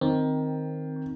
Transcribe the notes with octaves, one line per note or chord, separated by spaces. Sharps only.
D#3 C4